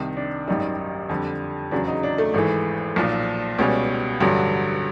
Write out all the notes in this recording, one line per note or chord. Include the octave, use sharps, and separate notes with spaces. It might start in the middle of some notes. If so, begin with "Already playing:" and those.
Already playing: C2 C3 D#3
D4
G#1 F#2 D#3 G3 D#4
D#4
F2 D3 G3
E2 C#3 F#3 D4
D#4
D4
A3
G#1 G#2 E3 A3
B1 A#2 F3
C#2 B2 G3 C#4
A1 G2 D3 F#3